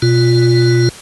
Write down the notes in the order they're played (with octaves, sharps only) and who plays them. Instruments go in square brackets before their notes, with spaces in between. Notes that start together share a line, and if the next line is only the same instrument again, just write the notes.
[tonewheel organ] B2 F4